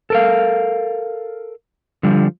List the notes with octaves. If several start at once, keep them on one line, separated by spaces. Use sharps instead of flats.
A4 A#4 F5
D3 F3 G3